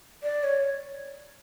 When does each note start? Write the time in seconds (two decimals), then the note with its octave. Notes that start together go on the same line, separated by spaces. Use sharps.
0.23 D5
0.44 C#5